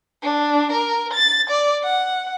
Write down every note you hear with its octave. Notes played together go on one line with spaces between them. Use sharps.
D4
A#4
A6
D5
F#5